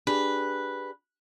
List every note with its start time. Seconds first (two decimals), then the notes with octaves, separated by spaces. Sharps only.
0.07 D4 G4 G#4 B4